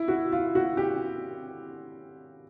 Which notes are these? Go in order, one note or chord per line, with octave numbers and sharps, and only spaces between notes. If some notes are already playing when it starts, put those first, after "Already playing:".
Already playing: E4
F#4
F4
F#4
G4